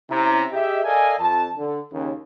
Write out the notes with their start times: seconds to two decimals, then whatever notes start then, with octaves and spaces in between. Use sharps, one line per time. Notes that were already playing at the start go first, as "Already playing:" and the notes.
0.11 C3 C#4 E4 A#5
0.52 G4 G#4 D#5 E5
0.84 A4 A#4 D5 D#5 F5 G#5
1.19 F2 A5
1.57 D3
1.92 D#2 C#3